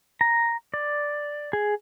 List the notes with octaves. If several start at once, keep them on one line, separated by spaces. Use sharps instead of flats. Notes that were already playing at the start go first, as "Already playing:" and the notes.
A#5
D5
G#4